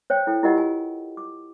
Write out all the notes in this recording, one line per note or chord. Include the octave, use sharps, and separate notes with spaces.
C5 C#5 G5
E4 A4 G5
E4 F4 G4 A#4 D#5 F#5
G#5
D6